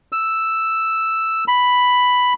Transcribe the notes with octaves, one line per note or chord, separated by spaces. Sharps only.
E6
B5